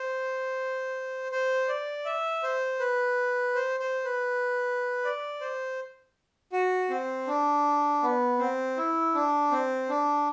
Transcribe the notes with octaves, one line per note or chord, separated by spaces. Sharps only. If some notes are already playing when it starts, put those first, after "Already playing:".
Already playing: C5
C5
D5
E5
C5
B4
C5
C5
B4
D5
C5
F#4
C4
D4
B3
C4
E4
D4
C4
D4